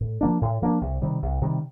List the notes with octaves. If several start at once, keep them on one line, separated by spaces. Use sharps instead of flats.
A2
F3 A#3 D4
A2
F3 A#3 D4
C2
C3 D#3 G3
C2
C3 D#3 G3